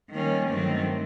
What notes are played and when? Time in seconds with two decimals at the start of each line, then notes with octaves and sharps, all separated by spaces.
0.11 D#3 G3 A#3 C#4
0.49 G2 D#3 F#3 A3 C4